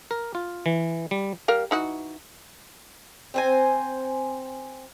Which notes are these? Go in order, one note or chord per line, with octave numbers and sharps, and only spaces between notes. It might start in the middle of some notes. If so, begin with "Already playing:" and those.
A#4
F4
E3
G3
G3 A#4 F5
E3 D#4 F#4
C4 C5 G#5